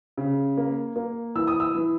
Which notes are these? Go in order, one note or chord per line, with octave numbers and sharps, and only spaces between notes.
C#3
A#3
A#3
E3 E6
D#6
E6
E3